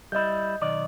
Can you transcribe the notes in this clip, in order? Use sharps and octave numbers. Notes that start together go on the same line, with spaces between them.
G3 E4 D#5 G6
B1 D#3 D5 D#5